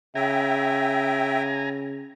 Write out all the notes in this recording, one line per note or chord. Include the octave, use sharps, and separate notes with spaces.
C#3 E5 G5 G#5 A#5